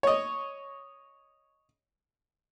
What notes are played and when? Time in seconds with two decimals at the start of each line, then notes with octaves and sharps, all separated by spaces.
0.03 C#5 D#5